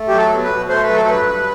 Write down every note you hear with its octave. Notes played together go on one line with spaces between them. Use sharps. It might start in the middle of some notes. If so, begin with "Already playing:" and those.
Already playing: A3
F#3 G4
A4
B2
B4
B2
A3 C5
B4
F#3
A4
G2 B4
G2